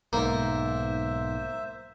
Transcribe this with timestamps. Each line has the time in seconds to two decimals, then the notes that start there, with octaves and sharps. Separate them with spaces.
0.13 B1 G#2 A#3 C5 E5